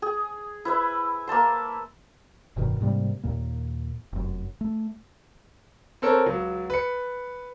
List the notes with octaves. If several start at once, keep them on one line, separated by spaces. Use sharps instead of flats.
G#4
E4 B4 E5
A#3 E5 A5 C6
F1 G2 B2 D#3
G#2 C3 G3 A#3
D#2 A#2 A#3
F1 F#2
A3
C4 A4 A#4 C#5
C#2 F#3
B4 C#7